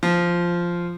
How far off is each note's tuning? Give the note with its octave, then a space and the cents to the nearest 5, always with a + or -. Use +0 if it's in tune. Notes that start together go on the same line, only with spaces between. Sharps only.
F3 -5